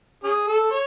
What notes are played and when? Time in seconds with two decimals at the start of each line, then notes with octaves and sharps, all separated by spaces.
0.24 C#4 G#4
0.48 A4
0.71 C#5